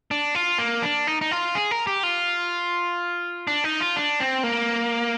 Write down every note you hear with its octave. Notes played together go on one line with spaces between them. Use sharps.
D4
F4
A#3
D4
D#4
D#4
F4
G#4
A#4
G4
F4
D4
D#4
F4
D4
C4
A#3